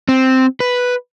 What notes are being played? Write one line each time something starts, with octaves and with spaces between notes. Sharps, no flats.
C4
B4